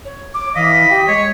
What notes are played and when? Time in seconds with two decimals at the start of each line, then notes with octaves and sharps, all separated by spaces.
0.05 C#5
0.34 D6
0.55 E3 D#5 F5 B6
0.90 G4 G5
1.07 G#3 C#5 D#5